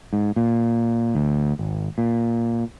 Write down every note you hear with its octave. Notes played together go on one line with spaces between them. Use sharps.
G#2
A#2
D2
G#1
A#2